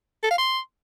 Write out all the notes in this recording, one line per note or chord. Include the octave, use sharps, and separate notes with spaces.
A4
F5
C6